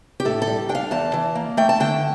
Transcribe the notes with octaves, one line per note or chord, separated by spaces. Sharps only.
G4
A2 A4
A4
G3
D4 G5
F5
E2 A5
E3
A#3
A3 G5
A5
D3 G5